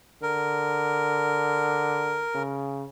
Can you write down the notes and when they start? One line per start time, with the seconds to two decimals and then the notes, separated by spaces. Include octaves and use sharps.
0.23 D3 A#4
2.35 C#3